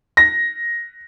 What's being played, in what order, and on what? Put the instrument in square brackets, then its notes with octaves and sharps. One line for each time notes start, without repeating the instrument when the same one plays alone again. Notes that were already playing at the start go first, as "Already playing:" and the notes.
[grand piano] A#6